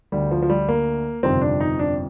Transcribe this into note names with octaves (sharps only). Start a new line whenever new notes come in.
D2 D3 G3
F3
F3
G3
A#3
G1 F2 C3 D#3 C4
D4
D#4
D4